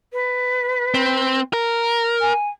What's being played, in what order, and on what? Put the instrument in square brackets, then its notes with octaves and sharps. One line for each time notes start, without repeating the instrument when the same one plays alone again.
[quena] B4
[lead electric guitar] C4
A#4
[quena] G#5